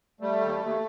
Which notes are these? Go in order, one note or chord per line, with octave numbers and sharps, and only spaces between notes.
G3 A3
D#2
D#2